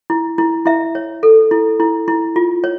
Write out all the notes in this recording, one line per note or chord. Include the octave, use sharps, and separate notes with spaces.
E4
E4
E4 E5
C#5
A4
E4
E4
E4
F4
C#5